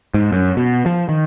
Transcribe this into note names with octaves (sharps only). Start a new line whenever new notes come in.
G#2
F#2
B2
F3
D#3